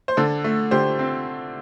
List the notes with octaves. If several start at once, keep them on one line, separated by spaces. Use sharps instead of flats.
C5
D3 A4
A3
D3 G4 C5
C4